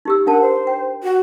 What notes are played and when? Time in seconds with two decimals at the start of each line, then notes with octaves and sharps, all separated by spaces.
0.05 D#4 G4 E6
0.27 D4 A#4 F#5 A5
0.41 C5
0.67 G5
1.03 F#4